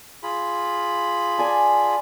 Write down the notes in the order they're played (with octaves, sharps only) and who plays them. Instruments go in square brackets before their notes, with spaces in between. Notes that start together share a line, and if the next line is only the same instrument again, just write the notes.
[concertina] F4 G#4 B5
[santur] D5 G#5 A5